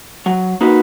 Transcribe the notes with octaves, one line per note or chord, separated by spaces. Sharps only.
F#3
A#3 D#4 F#4 B4